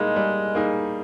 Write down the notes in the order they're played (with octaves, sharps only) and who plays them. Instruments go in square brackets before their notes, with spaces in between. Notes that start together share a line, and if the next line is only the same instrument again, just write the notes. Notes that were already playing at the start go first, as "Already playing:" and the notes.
Already playing: [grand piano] G3 A#3 D#4 G#4 [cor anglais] G#3
[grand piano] G3
A#3 D#4 G#4